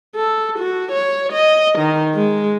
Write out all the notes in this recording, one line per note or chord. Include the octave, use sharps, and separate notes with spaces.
A4
F#4
C#5
D#5
D#3
G#3